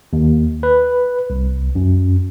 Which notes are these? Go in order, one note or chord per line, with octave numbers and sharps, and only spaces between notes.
D#2
B4
C2
F#2